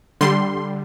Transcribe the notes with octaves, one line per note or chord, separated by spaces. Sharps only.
D3 G3 C6